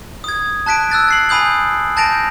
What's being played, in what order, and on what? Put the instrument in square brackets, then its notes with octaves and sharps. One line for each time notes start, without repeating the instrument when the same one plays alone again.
[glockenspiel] D#6 G#6
A5 F#6 B6 D7
E6 F#6 A6 B6
A6 C7 F#7
G#5 B5 D#6 G6 F#7
A5 G6 A6 A#6 D7 F7